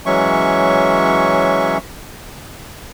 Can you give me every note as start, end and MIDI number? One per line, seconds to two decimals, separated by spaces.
0.06 1.78 52
0.06 1.78 54
0.06 1.78 56
0.06 1.78 61
0.06 1.78 76
0.06 1.78 85